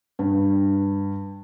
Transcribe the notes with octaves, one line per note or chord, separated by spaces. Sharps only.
G2